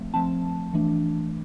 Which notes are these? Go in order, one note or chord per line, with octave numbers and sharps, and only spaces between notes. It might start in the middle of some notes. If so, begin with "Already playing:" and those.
Already playing: F3 A3 C4
F3 A3 C4 A5
E3 A3 D4